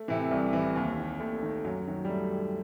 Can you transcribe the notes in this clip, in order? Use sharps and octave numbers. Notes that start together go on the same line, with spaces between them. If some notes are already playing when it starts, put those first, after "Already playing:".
Already playing: A3
C3 E3
C2
C3 E3
D#2
D#3
D#2 A3
D#3
F#2 F#3
D#3 F#3
G3
A3